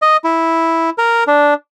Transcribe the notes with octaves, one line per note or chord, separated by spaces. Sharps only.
D#5
E4
A#4
D4